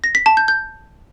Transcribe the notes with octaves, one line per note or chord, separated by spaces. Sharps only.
A#6
B6
A5
G6
G6